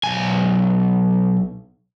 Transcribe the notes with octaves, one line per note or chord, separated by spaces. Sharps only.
B1 G#5